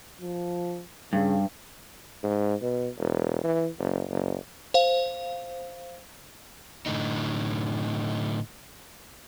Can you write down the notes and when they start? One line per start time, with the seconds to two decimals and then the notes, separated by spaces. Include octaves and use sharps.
0.21 F3
1.13 G2 C#3
2.24 G#2
2.62 B2
2.98 E1
3.44 E3
3.79 F#1
4.10 F#1
4.74 C5 F5
6.86 A2 D3 D#4